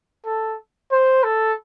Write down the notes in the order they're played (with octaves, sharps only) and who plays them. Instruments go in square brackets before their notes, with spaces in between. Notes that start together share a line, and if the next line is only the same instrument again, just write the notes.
[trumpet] A4
C5
A4